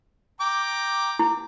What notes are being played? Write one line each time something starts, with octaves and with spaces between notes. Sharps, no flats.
G5 A#5 D6
E4